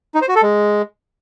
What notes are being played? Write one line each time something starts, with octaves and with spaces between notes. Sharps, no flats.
D#4
C5
F#4
A4
G#3